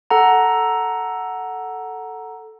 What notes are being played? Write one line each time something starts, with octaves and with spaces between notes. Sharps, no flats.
A4 F#5 A#5